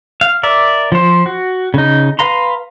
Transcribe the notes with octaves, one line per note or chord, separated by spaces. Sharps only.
F5
A#4 D5 E5
F3 C5
F#4
C#3 D#4
B4 F5 A#5 C6